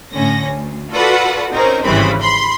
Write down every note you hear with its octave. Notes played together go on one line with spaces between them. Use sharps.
A2 D3 C#4 A#6
D2
F4 F#4 A4 B4 D5 F#5
C4 C#4 D#4 A#4 C5
G#1 C#3 E3 G3 C4 B5
B5 C6